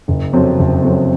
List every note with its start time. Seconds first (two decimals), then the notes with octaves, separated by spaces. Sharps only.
0.08 F#1
0.33 F2 C3 F#3 C4
0.59 F#1
0.84 F2 C3 F#3 C4